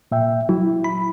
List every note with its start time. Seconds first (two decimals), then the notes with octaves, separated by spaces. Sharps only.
0.12 A#2 E5 G5
0.49 F#3 E4
0.84 B5